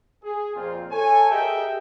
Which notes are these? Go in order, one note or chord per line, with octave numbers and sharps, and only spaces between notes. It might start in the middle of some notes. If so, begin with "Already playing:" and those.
G#4
F2 A#2 C4 F4
A4 C#5 G#5
G4 G#4 A#4 D#5 E5 G5